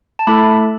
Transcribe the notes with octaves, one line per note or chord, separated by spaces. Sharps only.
A5
A3 E4 A4 B5